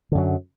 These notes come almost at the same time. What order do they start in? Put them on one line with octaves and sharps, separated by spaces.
D3 F#2 F#3